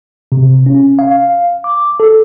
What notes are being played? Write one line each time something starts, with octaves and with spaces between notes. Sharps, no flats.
C3
C#4
F5
D6
A4